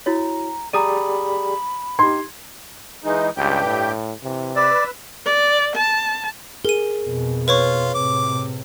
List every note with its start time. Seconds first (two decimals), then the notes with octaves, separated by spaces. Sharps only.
0.06 E4 F#4 C#5 A#5
0.73 G4 G#4 D5 A#5 B5 D#6 D#7
1.99 D#4 G4 C6 G#6
3.04 E3 G#3 D#4
3.37 C#2 G2 G4 G5
3.66 A2
4.23 C3 E3
4.56 B4 D5 E6
5.25 D5
5.76 A5
6.65 G#4 A#4 D#7
7.03 F2 B2
7.48 F4 B4 C#5 C#6
7.94 A2 C3 D6